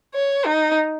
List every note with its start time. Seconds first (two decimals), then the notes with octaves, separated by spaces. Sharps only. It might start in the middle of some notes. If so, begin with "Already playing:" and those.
0.14 C#5
0.46 D#4